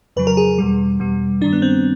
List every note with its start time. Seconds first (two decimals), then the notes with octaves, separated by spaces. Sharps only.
0.16 F2 C#3 F#3 B4
0.27 A#4
0.37 G#4
0.58 E2 B2 G3
1.00 E2 B2 G3
1.41 G2 D#3 G3 D4
1.53 B3
1.62 C4